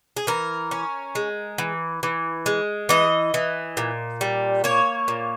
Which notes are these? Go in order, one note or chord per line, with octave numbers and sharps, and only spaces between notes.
G#4
E3 A#4
C#4
G#3
E3
E3
G#3
E3 D#5
E3
A#2
G3
A#3 C#5
A#2